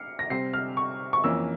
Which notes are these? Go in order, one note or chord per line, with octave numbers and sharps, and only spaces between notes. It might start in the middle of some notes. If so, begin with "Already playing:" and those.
Already playing: F6 C7 C#7
A#6
C3 G3 C4 C7
F6
C#6
C#6
F2 E3 A#3 C#4 E6